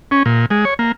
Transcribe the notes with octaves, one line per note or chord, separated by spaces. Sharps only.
C#4
A#2
G#3
C#5
A#3